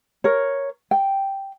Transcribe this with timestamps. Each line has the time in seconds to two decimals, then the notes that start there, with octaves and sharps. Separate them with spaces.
0.24 A#4 C#5
0.91 G5